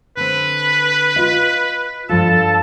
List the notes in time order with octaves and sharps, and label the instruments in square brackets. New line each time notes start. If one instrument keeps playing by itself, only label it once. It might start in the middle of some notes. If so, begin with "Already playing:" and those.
[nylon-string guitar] D3 C4 [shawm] B4
[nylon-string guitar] F4 D#5
[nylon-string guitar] G2 F3 F4 [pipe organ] A4 A5